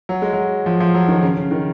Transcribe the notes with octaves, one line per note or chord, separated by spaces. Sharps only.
F#3
G#3
F#3
F3
F3
F#3
D#3
C#3
C#3
D#3